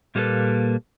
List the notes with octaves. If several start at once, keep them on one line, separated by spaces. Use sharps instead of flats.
A#2 G3 A#3 C#4 A4 B4